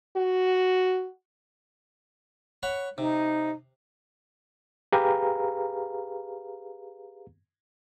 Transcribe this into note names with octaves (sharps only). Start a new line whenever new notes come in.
F#4
C#5 F#5 B5
C3 D#4
G4 G#4 B4 F5 A#5